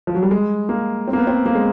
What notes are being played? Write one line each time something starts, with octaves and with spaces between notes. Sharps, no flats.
F3
F#3
G3
G#3
A#3
C4
A#3
B3
C4
A#3
G#3